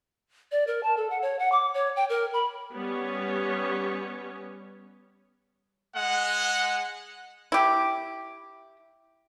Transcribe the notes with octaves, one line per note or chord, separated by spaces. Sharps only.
D5
A#4
A5
A4
F#5
C#5
F#5
D6
C#5
G5
A#4
B5
G3 B3 C#4 C#5
G#3 F#5
E4 G4